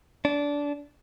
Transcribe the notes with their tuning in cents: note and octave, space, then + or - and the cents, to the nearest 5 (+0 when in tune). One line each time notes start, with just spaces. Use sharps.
D4 -20